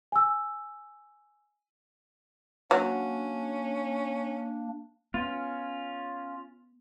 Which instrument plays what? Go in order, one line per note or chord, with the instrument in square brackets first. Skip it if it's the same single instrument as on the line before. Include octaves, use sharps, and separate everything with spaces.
[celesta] G#5 E6
[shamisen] F#3 [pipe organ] A#3 D4 [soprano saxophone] C#4
[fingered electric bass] B3 [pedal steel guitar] C#4 F4